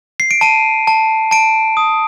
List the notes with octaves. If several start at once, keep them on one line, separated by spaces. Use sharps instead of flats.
C7
D7
A5 D#7
A5
A5 D7
D#6